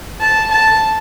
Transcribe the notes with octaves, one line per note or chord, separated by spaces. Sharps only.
A5
A5